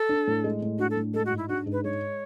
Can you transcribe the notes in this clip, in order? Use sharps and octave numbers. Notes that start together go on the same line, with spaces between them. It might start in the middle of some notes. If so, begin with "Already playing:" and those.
Already playing: A4
D4
A2
G#3
A2
D4 F#4
A4
A2
G#3 A4
F#4
G#2
E4
D4 F#4
G#2
B4
G#3 C#5